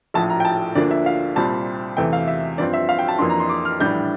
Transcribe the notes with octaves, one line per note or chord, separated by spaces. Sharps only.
A#1 A2 F3 A5
A#5
G5
A5
D2 D3 F3 A#3 D4 D5
E5
F5
C2 A#2 G3 C4 A5
E2 C3 E3 A3 G5
F5
E5
G2 F3 C4 D5
E5
F5
G5
A5
F2 E3 A#3 D4 C6
A#5
C6
D6
F6
A#1 A2 E3 G3 D4 G6